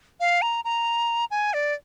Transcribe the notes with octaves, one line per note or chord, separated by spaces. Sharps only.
F5
A#5
A#5
G#5
D5